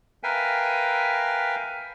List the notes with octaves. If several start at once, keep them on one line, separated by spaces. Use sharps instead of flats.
A#4 B4 E5 F5 G5 G#5